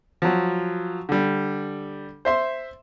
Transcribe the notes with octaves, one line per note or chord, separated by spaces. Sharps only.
F3 F#3
D3 G3
C5 E5 C6